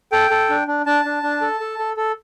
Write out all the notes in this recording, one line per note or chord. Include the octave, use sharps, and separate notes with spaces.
A4 G5
A4
D4
D4
D4 A5
D4
D4
A4
A4
A4
A4